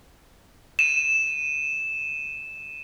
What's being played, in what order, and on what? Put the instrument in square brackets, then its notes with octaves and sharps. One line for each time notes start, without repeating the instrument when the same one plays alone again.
[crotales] D#7 E7